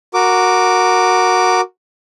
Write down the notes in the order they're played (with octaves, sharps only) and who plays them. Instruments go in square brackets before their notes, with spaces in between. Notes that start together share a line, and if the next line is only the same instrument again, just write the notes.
[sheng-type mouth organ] F#4 A#4 D6